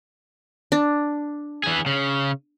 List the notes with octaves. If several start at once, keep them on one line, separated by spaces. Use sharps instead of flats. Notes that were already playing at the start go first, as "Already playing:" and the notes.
D4
E3 G#4
C#3